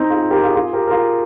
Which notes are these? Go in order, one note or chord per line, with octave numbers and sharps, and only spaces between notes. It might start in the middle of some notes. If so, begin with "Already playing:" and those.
Already playing: C4 D#4
F4 G#4
G4 A#4
F4 G#4
F4 G#4
G4 A#4
A#4
F4 G#4